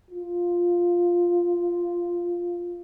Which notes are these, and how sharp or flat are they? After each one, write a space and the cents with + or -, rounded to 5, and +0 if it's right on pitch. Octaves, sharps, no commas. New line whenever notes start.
F4 +0